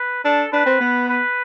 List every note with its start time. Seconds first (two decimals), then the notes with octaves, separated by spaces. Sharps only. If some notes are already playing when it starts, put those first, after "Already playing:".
Already playing: B4
0.24 D4 A4
0.52 D4 B4
0.66 C4
0.81 B3
1.08 B4